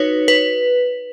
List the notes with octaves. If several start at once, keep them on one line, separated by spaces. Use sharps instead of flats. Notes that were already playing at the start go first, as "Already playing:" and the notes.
Already playing: D#4 F#4 B4 C#5
B4